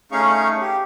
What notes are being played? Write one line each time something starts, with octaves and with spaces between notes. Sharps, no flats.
A3 C#4 D#4 G#4 F5 C#6
G4